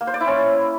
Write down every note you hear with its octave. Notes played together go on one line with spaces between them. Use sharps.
A#3
C5
D5
E4
C#4